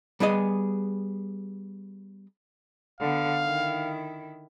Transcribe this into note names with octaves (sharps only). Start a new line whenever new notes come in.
G3 B3 G#4 D#5
D3 B3 F5
D#3 E4